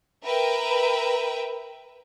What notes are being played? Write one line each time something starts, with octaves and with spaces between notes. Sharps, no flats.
A#4 B4 E5 G5